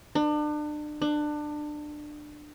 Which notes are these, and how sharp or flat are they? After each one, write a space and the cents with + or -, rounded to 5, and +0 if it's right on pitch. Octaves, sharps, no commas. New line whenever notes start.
D4 +35
D4 +25